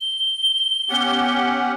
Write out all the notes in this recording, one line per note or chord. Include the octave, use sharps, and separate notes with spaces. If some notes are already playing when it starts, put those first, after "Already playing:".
G7
B3 C#4 G4 F#5